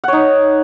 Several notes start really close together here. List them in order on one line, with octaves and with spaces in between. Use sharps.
F#5 C#5 D#4